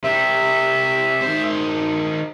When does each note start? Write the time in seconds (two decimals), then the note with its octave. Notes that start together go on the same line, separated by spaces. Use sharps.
0.04 C3 G3 E5
1.22 D#3 C5